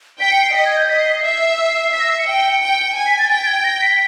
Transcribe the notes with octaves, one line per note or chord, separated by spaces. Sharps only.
G5 B6
C#7
C7
D#5 B6
G#6
G6
D#5 B6
C7
B6
C7
E5
E5 B6
A#6
C7
C#7
G5
G5
G#5
B6
A6
G5 A6
A6
G#6
A#6
B6